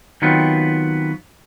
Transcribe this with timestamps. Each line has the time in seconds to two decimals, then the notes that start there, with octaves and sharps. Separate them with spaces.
0.22 D#3 F#3 B3 C4 F4